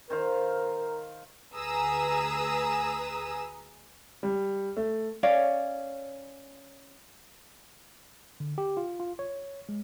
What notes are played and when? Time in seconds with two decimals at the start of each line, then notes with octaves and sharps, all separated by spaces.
0.10 D#3 A#4 C5 F5
1.56 D2 G#4 B4 A#5 D#6 E6
4.23 G3
4.77 A3
5.23 C#4 C#5 D5 F5
8.40 D3
8.58 G4
8.77 F4
9.00 F4
9.19 C#5
9.69 G#3